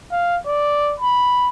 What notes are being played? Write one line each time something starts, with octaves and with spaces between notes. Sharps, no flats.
F5
D5
B5